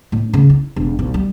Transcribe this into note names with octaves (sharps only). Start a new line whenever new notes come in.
A2
C#3
E4
E1
B1
G3